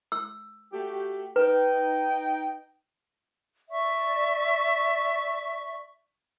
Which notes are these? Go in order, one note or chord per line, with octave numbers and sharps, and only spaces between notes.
E6
A3 F#4 G4
D#4 B4 G5
D5 E5 C#6